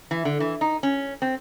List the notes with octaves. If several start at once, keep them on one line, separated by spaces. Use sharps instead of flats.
E3
D3
E3
D#4
C#4
C4